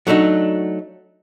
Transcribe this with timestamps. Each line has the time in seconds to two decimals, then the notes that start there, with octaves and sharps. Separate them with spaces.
0.07 F#3 A3 D4 D#4 F#4